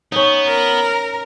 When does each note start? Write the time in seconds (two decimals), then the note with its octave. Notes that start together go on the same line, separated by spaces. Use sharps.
0.12 B3 C#4 D#4
0.48 A#4